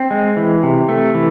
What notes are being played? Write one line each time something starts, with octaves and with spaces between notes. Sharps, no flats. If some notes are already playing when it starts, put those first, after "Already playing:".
Already playing: C4
G#3
E3
C3
A3
E3